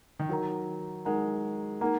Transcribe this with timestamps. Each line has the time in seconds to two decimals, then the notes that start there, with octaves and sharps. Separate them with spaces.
0.19 D#3
0.29 F#3 D#4 A#4 F#5 A#5
1.05 G#3 D#4 A#4 F#5 A#5
1.81 A#3 D#4 A#4 F#5 A#5